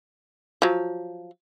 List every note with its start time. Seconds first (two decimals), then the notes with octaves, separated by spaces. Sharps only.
0.62 F3 F#3